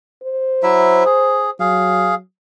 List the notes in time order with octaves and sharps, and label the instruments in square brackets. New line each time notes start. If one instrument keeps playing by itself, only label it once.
[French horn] C5
[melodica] F#3 E4 E5
G#4
[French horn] F#3 [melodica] G#4 F5